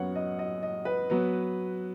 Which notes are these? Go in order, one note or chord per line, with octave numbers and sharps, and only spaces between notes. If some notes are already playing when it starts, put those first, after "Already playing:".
Already playing: F#2 F#3 B3 C#5 F#5
D#5
D#5
D#5
B4
F#3 B3